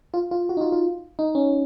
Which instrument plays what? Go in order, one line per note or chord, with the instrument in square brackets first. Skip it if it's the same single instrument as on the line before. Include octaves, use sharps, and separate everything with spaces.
[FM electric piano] F4
F4
F#4
D#4
F4
F4
D#4
C#4